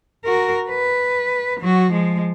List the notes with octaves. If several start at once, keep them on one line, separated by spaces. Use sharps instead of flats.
F#4 A#4
B4
F#3 F#4
F3 G#3